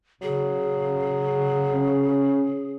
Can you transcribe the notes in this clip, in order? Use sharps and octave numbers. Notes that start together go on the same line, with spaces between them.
C#3 F#3 G#4
C#4